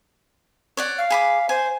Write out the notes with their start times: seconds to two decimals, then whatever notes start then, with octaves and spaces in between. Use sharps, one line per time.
0.77 C#5 D5 F#5
0.98 F5
1.10 G#4 B5 D6
1.49 C5 G#5